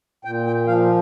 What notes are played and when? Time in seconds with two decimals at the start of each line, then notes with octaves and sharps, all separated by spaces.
0.25 A#2 G5
0.46 G5
0.67 F3 F5